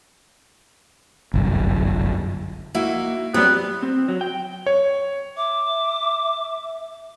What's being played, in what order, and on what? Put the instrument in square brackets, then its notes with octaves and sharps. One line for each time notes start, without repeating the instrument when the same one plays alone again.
[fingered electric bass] G1 C2 F#2
[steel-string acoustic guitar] A#3 D#4 F#4 [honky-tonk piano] E4
[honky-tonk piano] F#3 G3 [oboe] B3 [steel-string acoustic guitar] C4
[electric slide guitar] C4
F#3
G5
[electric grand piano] C#5
[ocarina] E5 [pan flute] D6